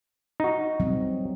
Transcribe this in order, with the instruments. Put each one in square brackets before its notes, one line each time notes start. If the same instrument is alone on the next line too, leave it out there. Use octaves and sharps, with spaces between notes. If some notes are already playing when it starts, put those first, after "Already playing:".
[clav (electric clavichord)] D#4 F#4
[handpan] F#3 G3 C4